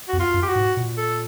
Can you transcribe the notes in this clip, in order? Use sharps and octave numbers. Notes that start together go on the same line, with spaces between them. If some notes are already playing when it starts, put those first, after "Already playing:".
F2 F#4
F4
F#2
G4
F#4
G#2
A#2
A4